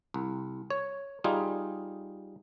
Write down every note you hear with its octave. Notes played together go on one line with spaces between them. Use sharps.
C2
C#5
G3 D#4 F4 G#4